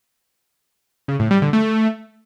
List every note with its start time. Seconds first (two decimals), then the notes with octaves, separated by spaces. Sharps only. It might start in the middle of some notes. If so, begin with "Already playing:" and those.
1.08 C#3
1.20 A2
1.31 G3
1.42 D3
1.53 A3